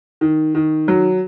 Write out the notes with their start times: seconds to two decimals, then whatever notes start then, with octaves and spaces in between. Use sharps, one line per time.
0.21 D#3
0.55 D#3
0.88 F#3